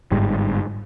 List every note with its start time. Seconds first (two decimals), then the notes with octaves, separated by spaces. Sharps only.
0.12 G1 G#2 G3